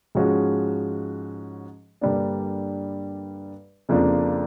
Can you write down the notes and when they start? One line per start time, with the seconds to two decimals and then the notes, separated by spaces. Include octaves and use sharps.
0.15 G#2 F3 G#3 C#4 F#4
2.01 G2 D3 G3 A#3 D4
3.89 F2 C#3 F3 A#3 D4